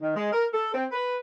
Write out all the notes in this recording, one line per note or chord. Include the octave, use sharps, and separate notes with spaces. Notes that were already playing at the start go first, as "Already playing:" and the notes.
D#3
G#3
A#4
A4
C4
B4